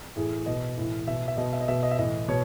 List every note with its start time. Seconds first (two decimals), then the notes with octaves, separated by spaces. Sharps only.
0.16 A2 E3 G#4
0.46 B2 D#5
0.77 A2 E3
1.07 B2 E5
1.28 E5
1.37 B2 D#5
1.53 E5
1.60 D#5
1.68 B2 E5
1.83 D#5
1.91 E5
1.98 A2 E3 D#5
2.28 B2 C#5